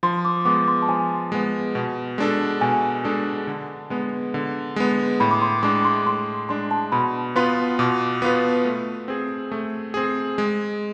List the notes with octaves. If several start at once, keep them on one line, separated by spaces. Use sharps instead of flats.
F3 C6
D6
G#3 B3 D6
C6
A5
F3 G#5
G#3 B3
B2
G#3 D4 A4
B2 G#5
G#3 D4 A4
D3
G#3 B3
D3
G#3 B3
A2 B5
D6
C6
G#3 D4 D6
C6
A2 C6
G#3 D4 C6
A5
B2 B5
B3 F4 B4 C6
B2 D6
B3 F4 B4
A3
C4 G#4
A3
C4 G#4
G#3